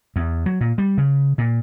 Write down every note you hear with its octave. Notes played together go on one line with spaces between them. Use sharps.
E2
F#3
A#2
G3
C#3
A#2